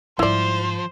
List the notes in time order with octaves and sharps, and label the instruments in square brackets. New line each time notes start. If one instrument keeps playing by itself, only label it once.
[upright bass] G#2 G3 [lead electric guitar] F3 [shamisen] E4 D5 [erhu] C5